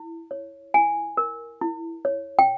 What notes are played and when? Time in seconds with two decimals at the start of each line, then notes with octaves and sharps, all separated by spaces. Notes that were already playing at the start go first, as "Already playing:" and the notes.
Already playing: E4
0.31 C#5
0.74 E4 G#5
1.17 A#4
1.61 E4
2.05 C#5
2.39 G5